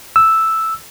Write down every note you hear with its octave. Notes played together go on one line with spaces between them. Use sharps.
E6